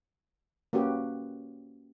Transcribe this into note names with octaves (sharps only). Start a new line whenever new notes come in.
A#3 C#4 F#4 G4 B4